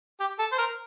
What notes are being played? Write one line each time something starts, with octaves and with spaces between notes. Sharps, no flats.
G4
A4
C5
A#4